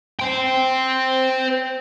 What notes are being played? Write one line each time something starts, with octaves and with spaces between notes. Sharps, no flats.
C5 G5